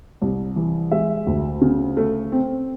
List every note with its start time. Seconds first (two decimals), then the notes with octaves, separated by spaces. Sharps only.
0.22 C2
0.56 E3
0.91 G#3 E5
1.27 D2
1.61 C#3
1.97 A3
2.32 C4